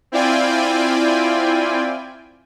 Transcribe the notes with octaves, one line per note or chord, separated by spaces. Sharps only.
C4 E4 F4 D5 G5 G#5